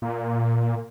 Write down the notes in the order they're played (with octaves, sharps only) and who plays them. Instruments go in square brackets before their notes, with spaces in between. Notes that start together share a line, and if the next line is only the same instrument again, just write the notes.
[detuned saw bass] A#2